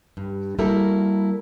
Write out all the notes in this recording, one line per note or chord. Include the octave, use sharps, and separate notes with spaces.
G2
G3 A#3 E4 F#4 A4 A#4